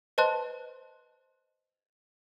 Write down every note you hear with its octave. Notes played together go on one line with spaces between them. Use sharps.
B4 C5 D#5 A5 C6 F#6